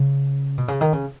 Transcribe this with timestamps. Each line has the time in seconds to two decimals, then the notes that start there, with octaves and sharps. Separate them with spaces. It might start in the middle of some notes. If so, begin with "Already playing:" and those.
Already playing: C#3
0.58 B2
0.68 C#3
0.81 D#3
0.93 C#3